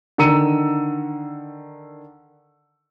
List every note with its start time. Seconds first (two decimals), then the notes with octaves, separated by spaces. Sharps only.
0.18 D3 D#3 A#5 E6 C#7 D#7